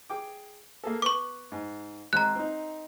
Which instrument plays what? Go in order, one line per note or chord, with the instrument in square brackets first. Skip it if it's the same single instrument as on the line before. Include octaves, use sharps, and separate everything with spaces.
[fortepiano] G#4 G5 D6
A#3 G#4 A4
[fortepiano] B3 [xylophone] C#6 D6
[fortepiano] G#2
[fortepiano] G#1 G#3 C4 [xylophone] A#5 F#6
[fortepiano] C4 D#4